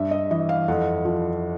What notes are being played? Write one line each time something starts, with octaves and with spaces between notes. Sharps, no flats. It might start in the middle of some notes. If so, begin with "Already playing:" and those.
Already playing: G2 E5
D#5
E3 D#5
F5
F2 F#5
F3